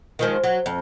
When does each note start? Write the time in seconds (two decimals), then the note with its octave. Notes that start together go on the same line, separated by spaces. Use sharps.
0.19 D#3 F3 G#3
0.44 F#3
0.66 F2